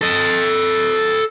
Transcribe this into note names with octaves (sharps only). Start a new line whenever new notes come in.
A4 D#5